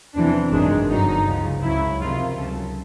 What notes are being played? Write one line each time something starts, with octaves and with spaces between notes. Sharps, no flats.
E2 C3 E3 D4
G#1 F#2 D#3 G#3 D4
G1 F#2 D3 F#3 D#4
C#2 C#3 F3
C#2 C#3 F#3 E4
F2 C3 D#3 F4
C#2 C#3 F#3 A4